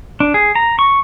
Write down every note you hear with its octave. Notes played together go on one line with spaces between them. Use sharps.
D4
G#4
A#5
C#6